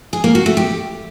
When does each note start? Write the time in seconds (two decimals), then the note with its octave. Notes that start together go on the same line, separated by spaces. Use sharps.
0.13 G#4
0.24 A#3
0.35 F#4
0.46 A3
0.57 G4